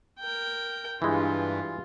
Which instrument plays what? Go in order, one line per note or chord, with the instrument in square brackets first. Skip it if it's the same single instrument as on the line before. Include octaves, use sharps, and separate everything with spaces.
[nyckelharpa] A#4 G5
[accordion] G2 [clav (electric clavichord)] E3 G#3 [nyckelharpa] F4